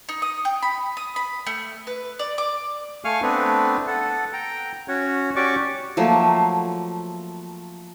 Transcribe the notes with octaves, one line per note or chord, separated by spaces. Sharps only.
D#4
D#6
G5
B5
D#6
B5
A3
B4
D5
D6
A3 F5 G#5 C#6 F6
A3 B3 C4 D4 B4
A4 F#5
G5 A#5
C#4 F#4 C#5 F#5
C#4 F#4 G4 D5 C#6 D6
F3 F#3 A3 A#3